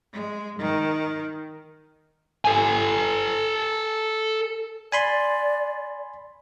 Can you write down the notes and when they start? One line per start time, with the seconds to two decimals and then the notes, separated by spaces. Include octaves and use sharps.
0.13 G#3
0.59 D#3
2.45 A4 G#5
4.92 D5 G#5 B5 C6